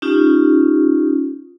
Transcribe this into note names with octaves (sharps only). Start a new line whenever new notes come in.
C#4 D#4 F4 G4